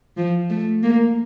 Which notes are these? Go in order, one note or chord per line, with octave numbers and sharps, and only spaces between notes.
F3
A3
A#3